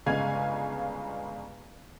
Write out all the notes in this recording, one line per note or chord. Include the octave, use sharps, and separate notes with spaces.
G1 C#3 G#3 F5 G#5 G#6